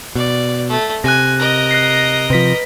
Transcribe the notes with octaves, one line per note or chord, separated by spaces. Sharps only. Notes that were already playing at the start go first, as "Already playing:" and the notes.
B2 D5
A3
C3 G#5 F#6 A#6
A#4 D#5
F#6 A#6 C7
C3 F3 B4 B6